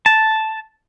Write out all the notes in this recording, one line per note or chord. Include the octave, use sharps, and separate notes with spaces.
A5